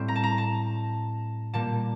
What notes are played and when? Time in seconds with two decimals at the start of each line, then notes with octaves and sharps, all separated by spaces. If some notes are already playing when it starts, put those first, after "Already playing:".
Already playing: A2 G3 C4
0.08 A#5
0.16 A5
0.23 A#5
0.38 A5
1.54 A#2 G3 A#3 A5